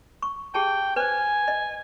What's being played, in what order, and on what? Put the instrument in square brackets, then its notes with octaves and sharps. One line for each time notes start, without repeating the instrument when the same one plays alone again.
[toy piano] C#6
[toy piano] G4 G#4 A5 [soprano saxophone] G5
[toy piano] B4 C5 [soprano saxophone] G#5
[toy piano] D#5